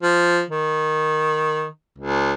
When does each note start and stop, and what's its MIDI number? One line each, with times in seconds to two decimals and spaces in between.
0.02 0.42 53
0.50 1.66 51
1.98 2.32 37